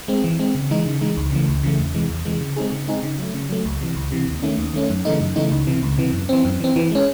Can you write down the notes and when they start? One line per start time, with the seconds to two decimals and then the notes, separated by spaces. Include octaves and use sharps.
0.08 G#3 C4
0.24 E3
0.39 G#3 C4
0.55 C#3
0.71 E3 G#3 D#4
0.86 C#3
1.01 E3 G#3 D#4
1.17 C#2
1.32 C#3 E3 A3
1.48 C#2
1.63 C#3 E3 A3
1.79 E2
1.94 C3 E3 G#3
2.10 E2
2.25 C3 E3 G#3
2.41 C#3
2.56 G#3 C4 D#4 G#4
2.72 C#3
2.87 G#3 C4 D#4 G#4
3.03 C#3
3.19 F#3 A3
3.34 C#3
3.50 F#3 A3
3.65 C#2
3.81 C3 E3
3.96 C#2
4.12 C3 E3
4.28 D#2
4.43 D#3 A3 C#4
4.58 D#2
4.74 D#3 A3 C#4
4.89 F#2
5.05 C#3 E3 A3 D#4
5.21 F#2
5.36 C#3 E3 A3 D#4
5.52 C#2
5.67 C3 E3
5.83 C#2
5.98 C3 E3
6.13 F#2
6.29 E3 C4
6.45 F#2
6.60 E3 C4
6.76 E3
6.91 G#3 C#4